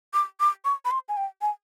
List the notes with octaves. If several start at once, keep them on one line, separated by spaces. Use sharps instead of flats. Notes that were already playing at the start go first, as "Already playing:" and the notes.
D6
D6
C#6
B5
C6
G#5
G5
G#5